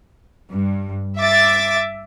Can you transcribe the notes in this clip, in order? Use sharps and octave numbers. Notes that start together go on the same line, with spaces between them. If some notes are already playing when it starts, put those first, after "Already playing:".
G2
E5 D6 A6